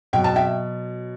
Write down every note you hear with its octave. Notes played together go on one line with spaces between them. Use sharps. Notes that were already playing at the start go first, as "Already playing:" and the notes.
B2 F#3 G5
A5
E5 G5